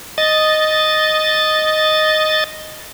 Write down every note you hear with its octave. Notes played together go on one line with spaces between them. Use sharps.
D#5 A6